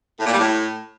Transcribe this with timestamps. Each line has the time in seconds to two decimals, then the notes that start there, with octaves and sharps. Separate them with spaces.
0.19 A2
0.26 A#2
0.32 G3
0.38 A2